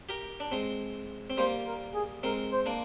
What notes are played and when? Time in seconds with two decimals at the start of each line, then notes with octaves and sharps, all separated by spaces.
0.09 G4 A#4
0.40 D4
0.52 G#3 C4
1.30 C4
1.38 G3 A#3 C5
1.66 A#4
1.94 G#4
2.23 G#3 C4 A#4
2.52 C5
2.66 A#3 D4